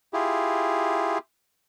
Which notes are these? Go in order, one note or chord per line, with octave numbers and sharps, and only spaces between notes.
E4 F4 G4 G#4